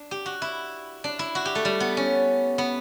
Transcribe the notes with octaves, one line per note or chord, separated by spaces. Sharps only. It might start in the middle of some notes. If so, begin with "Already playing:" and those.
Already playing: D4
G4
F#4
E4
D4
E4
F#4
G4
A3
G3
B3
C#4
B3